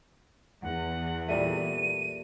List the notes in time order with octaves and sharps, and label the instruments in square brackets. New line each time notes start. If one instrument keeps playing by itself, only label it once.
[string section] E2 [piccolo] F#5
[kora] A#2 G3 A3 [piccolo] D#7